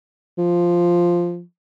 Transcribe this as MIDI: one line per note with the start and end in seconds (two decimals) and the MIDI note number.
0.38 1.42 53